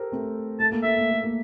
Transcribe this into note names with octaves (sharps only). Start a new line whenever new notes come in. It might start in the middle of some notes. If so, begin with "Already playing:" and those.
Already playing: G4 A4 A#4 C5
A3 C4
A3 A5
A#3
A3 E5
A#3
A3
A#3